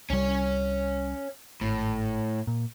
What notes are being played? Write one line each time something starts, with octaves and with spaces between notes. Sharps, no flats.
C2 G3 C#4 C#5
G#1 A2
A#2